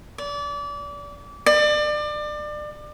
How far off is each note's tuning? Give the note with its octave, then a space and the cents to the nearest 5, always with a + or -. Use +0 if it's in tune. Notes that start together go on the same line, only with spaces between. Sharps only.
D5 -30
D5 +30